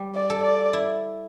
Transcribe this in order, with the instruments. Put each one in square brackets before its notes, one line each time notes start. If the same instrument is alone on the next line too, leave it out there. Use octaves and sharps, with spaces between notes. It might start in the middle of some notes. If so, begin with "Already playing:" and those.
Already playing: [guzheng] G3
[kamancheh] D5
[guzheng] A4
[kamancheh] D5
[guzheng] E4